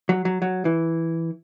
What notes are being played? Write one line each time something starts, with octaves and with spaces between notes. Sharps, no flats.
F#3
F#3
F#3
E3